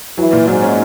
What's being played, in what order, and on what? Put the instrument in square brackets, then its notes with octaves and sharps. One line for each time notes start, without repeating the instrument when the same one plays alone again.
[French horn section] E3 [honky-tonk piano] F#3
[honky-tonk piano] A#2
[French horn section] G#2 [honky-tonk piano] F#3
[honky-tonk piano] C#4